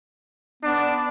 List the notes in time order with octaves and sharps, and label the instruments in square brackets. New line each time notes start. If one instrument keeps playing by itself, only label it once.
[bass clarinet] B3 [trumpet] D4